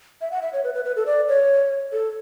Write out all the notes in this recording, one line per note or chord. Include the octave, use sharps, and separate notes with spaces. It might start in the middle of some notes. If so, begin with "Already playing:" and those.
E5
F#5
E5
C#5
B4
B4
B4
A4
D5
C#5
A4